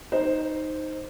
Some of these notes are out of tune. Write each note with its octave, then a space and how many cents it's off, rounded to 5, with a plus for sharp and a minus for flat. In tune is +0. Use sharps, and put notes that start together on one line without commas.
D#4 +0 C5 +0